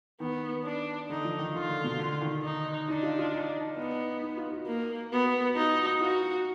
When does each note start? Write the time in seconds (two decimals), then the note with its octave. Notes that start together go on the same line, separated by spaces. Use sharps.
0.20 D#3 B3
0.65 D4
1.10 D3 D#4
1.25 F3
1.39 D#3
1.54 D3 F4
1.69 D3
1.84 B2
1.99 D3
2.21 D#3
2.44 D#4
2.88 D4 D#4
3.03 F4
3.19 F4
3.33 D#4
3.77 B3 D#4
4.22 D#4
4.37 F4
4.52 F#4
4.67 A#3
5.12 B3 F#4
5.48 F#4
5.56 D#4 F4
5.71 F#4
5.87 F#4
6.01 F4 F#4